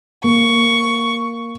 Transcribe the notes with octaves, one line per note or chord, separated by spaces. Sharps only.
A#3 C#6